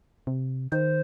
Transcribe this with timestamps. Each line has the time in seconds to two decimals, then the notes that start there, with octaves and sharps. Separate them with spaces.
0.27 C3
0.72 D#3 C5